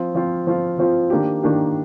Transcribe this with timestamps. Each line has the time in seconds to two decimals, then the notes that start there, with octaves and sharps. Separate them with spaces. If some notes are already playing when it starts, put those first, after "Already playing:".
Already playing: F3 C4 F4
0.15 F3 C4 F4
0.47 F3 C4 F4
0.79 F3 C4 F4
1.10 D#3 A#3 D4 G4
1.43 D#3 A#3 D4 G4